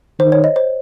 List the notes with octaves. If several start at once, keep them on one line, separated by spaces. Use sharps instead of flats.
D#3 C5
C#5
D#5
C5